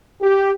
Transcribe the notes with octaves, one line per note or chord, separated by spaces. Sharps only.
G4